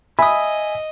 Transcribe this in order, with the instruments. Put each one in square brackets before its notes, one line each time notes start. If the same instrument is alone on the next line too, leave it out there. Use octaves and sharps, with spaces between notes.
[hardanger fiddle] D#5 [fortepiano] E5 D#6 [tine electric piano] G#5 [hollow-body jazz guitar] B5